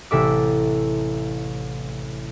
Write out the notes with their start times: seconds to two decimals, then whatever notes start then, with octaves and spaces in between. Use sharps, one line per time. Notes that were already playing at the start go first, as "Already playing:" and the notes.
0.11 A1 C3 A4 E5 D6